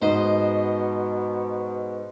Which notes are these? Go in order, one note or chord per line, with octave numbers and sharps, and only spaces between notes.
G#2 B2 C5 D#5